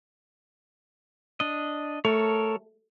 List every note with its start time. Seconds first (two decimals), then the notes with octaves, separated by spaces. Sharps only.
1.40 D4 D#5
2.05 A3 A4 A#4 C#5